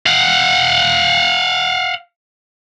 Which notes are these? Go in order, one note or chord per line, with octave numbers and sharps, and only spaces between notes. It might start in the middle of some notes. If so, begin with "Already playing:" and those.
F5 F#5